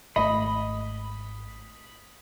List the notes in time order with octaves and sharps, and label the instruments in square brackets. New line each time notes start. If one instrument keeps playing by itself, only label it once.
[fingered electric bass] G#1 A3 [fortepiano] D#5 [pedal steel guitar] B5